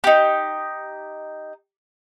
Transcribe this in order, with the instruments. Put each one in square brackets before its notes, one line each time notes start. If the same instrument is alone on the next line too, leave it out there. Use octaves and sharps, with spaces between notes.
[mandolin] D#4 G4